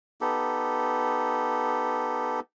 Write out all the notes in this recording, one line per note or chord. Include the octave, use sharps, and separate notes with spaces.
B3 D#4 G4 A4